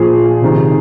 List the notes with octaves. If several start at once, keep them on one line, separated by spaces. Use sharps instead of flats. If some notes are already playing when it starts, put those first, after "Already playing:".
Already playing: A#2 F3 G#4
C3 D#3